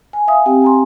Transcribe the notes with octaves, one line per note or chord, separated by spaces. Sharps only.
G#5
E5 F5 G#5 D#6
C4 G4 G5
G#5 A#5 C6